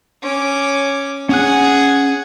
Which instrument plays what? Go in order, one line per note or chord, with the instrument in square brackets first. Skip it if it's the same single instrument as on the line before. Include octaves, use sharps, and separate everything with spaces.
[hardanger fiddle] C#4 D6
[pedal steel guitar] C#4 F#6 [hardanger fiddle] G#4 F#5